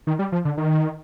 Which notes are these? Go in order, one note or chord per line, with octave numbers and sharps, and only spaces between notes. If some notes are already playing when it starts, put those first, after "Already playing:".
D#3
G3
F3
D3
D#3